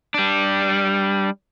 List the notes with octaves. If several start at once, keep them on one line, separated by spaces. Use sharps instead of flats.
G3 D4